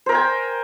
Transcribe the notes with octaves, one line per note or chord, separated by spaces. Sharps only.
A#4 C5 G5 G#5